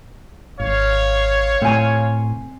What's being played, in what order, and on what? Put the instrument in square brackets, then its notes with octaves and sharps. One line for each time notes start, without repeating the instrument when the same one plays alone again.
[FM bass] G#1 [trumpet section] C#5 F5
[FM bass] A2 [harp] C4 G#5